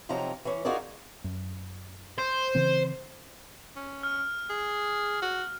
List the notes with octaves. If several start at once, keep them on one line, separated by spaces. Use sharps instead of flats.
F2 C3 F3 F#3 D#4 A#5
E3 C#4
D#4 F4 F#4 G#4 A#4 D5
F#2
C5
C#3 E3 C4
C#4
F6
G#4
F#4